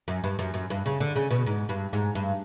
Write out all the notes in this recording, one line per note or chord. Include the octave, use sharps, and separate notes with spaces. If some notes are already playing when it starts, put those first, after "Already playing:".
F#2
G2
F#2
F#2
G2
C#3
D3
C#3
B2
G#2
G2
G#2
G2